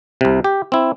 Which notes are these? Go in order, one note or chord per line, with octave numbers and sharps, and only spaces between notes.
C2 C3
G4
C4 E4